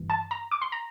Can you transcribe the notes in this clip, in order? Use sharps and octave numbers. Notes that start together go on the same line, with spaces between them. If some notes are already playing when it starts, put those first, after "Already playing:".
Already playing: G1 G2 E3
A5
A#5
D6
C6
A#5